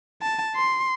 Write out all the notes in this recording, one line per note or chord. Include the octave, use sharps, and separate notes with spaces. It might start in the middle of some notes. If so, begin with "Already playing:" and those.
A5
C6